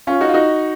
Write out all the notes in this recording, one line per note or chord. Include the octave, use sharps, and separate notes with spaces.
C#4 F4
D#4 F#4
F4
D#4 F#4